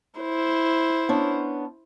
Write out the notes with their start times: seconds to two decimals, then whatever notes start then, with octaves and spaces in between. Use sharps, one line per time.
0.20 E4 C5
1.09 B3 C#4 D4